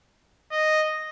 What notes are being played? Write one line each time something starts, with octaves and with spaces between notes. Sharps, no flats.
D#5